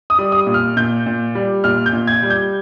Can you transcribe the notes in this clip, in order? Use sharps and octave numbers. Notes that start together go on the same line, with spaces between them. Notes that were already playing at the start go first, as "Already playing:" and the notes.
D#6
G3
D#6
A#2
F6
A#2 G6
A#2
G3
A#2 F6
G6
A#2
G#6
G3
G6